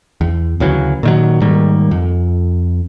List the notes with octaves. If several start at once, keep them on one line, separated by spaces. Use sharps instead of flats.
E2
D2 C#3 E3 F#3
A#2 D#3 F#3
G#2 D#3 G3 A#3
F2